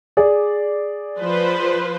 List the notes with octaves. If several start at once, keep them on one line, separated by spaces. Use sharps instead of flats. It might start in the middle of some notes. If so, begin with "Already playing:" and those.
G#4 D5
F3 B4 C5